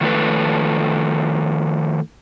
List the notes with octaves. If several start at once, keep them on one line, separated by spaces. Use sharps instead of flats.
D#3 F3 A3 A4 B4